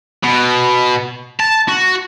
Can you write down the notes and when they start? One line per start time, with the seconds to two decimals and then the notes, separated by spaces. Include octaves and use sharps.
0.24 B2
1.40 A5
1.68 F#4